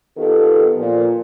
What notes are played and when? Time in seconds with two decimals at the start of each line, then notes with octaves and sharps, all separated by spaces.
0.17 D#3 B3 F4 G4 A4
0.76 A#2 F3